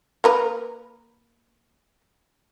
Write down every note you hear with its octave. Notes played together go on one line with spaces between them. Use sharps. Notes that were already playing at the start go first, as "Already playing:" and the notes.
A#3 A#4 B4